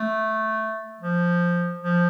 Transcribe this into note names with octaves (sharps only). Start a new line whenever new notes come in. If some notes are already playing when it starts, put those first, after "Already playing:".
Already playing: A3
F3
F3